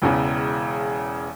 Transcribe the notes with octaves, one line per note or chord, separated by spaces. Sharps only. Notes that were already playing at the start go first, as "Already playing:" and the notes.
E1 E2 C#3